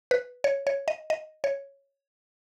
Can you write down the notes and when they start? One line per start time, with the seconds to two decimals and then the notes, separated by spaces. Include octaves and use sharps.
0.11 B4
0.44 C#5
0.67 C#5
0.88 D#5
1.10 D#5
1.44 C#5